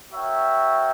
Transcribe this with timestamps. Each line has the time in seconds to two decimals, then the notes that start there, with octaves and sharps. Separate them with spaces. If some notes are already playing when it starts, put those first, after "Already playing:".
0.12 F#4 A#4 C#5 E5 G5